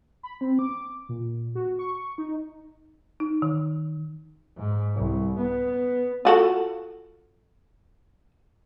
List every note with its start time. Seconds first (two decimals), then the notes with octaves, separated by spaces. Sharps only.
0.23 B5
0.41 C4
0.59 D6
1.09 A#2
1.55 F#4
1.79 C#6
2.18 D#4
3.20 D#4
3.42 D#3
4.57 G#2
4.96 C2
5.38 B3
6.25 F4 F#4 A4